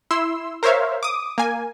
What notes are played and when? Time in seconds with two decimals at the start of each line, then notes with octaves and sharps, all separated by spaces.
0.11 E4 C6 E6
0.63 A#4 C5 C#5 E5 F5
1.03 D6 D#6
1.38 A#3 G#5